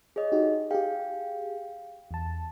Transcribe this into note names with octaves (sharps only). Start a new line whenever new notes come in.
G#4 C#5 D#5
D#4 F#4 G4
G4 G#4 F5 G5
E2 A5